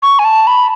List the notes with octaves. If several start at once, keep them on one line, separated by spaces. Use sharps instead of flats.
C#6
G#5
A5
B5